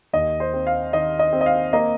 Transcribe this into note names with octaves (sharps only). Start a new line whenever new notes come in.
D#2 D#5
C5
C4
F5
D#3 D#5
D#5
C4
D#5
F5
A#3 D#5